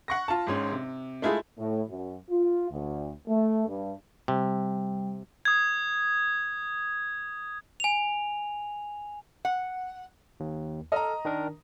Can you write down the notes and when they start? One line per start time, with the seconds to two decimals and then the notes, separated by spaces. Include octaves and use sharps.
0.08 F#5 C#6 A#6
0.28 F4 A5
0.47 G#1 G#2 C#4
0.72 C3
1.22 G#3 A3 E4 F4 G#4
1.58 A2
1.89 F#2
2.30 F4
2.71 D2
3.28 A3
3.67 G2
4.28 C3 G3
5.45 D#6 G#6
7.80 G#5 F7
9.45 F#5
10.40 D#2
10.92 A4 D#5 A#5 F6
11.25 D#3 D4 A#4